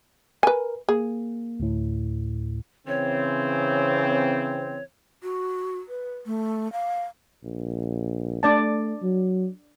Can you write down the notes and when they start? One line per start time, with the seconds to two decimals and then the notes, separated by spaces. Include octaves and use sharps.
0.43 A#4 B4 G#5
0.89 A#3 G#4
1.60 D2 A2
2.87 C#3 E3 C4 C#5
5.23 F#4
5.88 B4
6.26 A3
6.72 F5
7.43 A#1
8.43 A3 D4 D5 A5
9.02 F#3